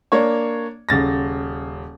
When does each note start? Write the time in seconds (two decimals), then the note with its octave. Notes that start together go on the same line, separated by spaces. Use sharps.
0.12 A#3 D4 C#5
0.89 D#1 C#3 A6 A#6